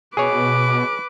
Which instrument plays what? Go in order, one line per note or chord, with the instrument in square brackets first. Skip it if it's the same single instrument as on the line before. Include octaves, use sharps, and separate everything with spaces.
[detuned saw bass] B2 [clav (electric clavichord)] G#4 C#5 [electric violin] B4 D6